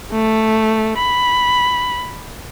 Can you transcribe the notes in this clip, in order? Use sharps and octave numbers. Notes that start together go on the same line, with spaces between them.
A3
B5